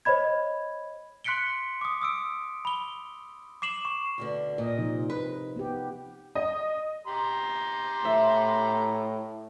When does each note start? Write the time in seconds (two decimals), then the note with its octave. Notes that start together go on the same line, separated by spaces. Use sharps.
0.05 C5 C#5 D#5 B5 G#6
1.24 C6 F#6 B6 C#7 D7 G7
1.81 D6 D#6
2.02 D#6 E6 D7
2.65 B5 G7
3.62 D6 C7 E7 F#7
3.85 C#6
4.18 D2 B2 D3
4.58 A#2 A#4 D#5
4.78 C3 F3 D#4
5.10 B4
5.56 B3 G4
6.35 D#5
7.07 G4 A#5 C6
8.05 A2 E5